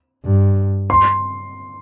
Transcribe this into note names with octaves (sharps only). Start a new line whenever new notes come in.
G2
C6